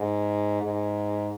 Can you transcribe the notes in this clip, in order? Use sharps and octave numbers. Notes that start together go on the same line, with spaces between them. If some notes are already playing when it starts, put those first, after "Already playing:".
Already playing: G#2
G#2